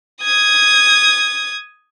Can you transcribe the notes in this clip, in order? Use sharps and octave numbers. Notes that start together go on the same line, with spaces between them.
D#6 G#6